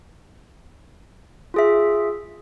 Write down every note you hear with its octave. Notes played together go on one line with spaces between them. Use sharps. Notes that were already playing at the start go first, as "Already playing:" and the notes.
F4 G#4 E5